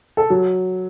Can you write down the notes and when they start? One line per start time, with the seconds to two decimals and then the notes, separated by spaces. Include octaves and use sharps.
0.17 A4
0.30 F#3